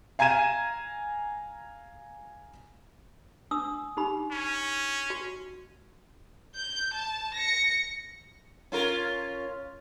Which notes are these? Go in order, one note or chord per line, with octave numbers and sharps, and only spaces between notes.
F5 G#5 A#5 G#6 D#7 E7
D4 D#6 E6
D#4 G4 B5
C#4
F#4
G6
A5
A#6 C#7
C#4 F4 A#4